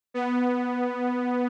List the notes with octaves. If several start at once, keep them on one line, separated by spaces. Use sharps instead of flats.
B3